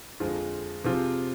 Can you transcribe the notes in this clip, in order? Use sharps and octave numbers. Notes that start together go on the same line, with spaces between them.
F2 D3 G#3 C4 F4
C3 F3 C4 F4 G#4